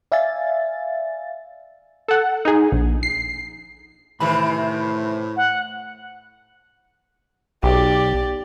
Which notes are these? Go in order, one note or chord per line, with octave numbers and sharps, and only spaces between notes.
D5 E5 F5 G#5 A6
A4 F#5
D#4 G#4
A#1
C7
A2 C3 D#3 E3 B5
F#5
B1 G4 D5